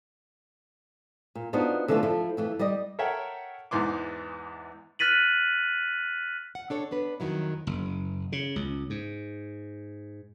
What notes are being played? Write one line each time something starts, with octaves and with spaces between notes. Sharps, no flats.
A#2
B3 D4 D#4 F4 F#4 C5
D3 E3 F3 A3 C#4
F3 E4 A4
F2 E3 A3
G3 G4 D5 D#5
A4 A#4 C#5 E5 F#5 G5
E2 G#2 E3 C6 D6
F6 F#6 A6 B6 D#7 F#7
F#5
D4 A4 C#5
B3 D4 B4
F2 D#3 F#3 E4
F#1
C#3
C#2
G#2